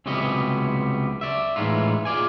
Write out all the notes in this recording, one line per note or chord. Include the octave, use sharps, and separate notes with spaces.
C#2 C3 F#3 G3 B3 D#5
D5 E5
A2 E3 F#3 G#3 D#4 F4
F4 G#4 D5 G#5